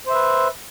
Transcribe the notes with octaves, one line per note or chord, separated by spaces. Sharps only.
B4 C5 E5